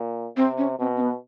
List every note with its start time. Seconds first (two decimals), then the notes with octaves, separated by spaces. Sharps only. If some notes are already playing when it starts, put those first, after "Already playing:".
Already playing: A#2
0.37 C3 C4
0.58 C#4
0.79 B2 C4
0.96 C4
1.01 B3